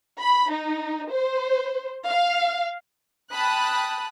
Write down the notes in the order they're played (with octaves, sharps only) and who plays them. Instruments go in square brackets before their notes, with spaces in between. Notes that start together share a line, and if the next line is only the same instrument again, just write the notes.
[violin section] B5
D#4
C5
F5
G5 A5 B5 D#6 F#6